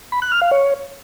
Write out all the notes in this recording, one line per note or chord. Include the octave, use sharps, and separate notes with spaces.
B5
F#6
F6
F5
C#5